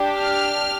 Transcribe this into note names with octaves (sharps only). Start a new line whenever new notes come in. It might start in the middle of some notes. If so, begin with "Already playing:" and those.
Already playing: D4 G4
F6